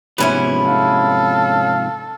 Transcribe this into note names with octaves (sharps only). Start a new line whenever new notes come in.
G#2 C3 F3 B3 C#4 E4
A4 F5